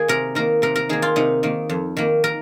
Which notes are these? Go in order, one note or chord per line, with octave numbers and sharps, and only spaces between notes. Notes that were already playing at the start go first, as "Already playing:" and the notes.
Already playing: D#3 A#3 G#4
C3 A#4
D#3 A#3 A#4
C3 A#4
A#4
D#3 A#3 G#4
F4
C3 D#4
D#3 A#3
F2
D#3 A#3
A#4